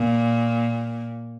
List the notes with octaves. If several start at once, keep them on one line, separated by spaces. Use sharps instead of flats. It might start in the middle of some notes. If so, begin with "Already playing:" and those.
Already playing: A#2